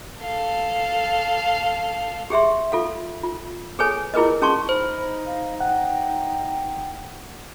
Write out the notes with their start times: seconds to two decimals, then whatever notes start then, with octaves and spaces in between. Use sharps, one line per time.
0.21 A4 F5
2.30 G4 G#4 E5 C6
2.72 F4 A4 F5
3.23 F4
3.79 G#4 A4 B4 C#5 G#5
4.14 E4 F4 G#4 A#4 B4 D#5
4.42 C#4 G#4 A5 C6 C#6
4.69 D#4 C5 B5
5.26 F5
5.60 F#5 G5